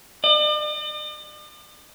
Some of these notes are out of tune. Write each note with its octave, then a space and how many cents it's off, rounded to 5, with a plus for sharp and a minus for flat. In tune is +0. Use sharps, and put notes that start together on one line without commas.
D5 +45